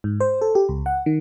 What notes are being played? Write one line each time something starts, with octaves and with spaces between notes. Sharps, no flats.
G#2
C5
A4
G4
C#2
F#5
D#3